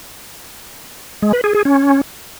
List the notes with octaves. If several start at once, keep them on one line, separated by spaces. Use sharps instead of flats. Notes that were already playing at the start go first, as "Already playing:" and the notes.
G#3
B4
G#4
G#4
C#4